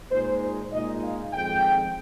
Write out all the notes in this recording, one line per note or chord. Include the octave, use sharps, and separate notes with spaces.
A#2 G#3 D#4 C5
C5
A#2 G#3 D#4 D#5
F5
F2 D#3 G#3 G5